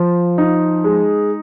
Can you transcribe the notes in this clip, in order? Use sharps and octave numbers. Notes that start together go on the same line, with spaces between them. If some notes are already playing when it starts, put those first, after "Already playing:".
Already playing: F3 F4
D#4
G#3